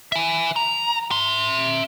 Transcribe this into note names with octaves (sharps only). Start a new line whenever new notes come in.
E5 G#5
A#5
E5 C6